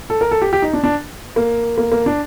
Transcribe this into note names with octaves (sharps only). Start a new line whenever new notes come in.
A4
A#4
A4
G4
G4
D#4
D4
D4
A#3
A#3
A#3
D4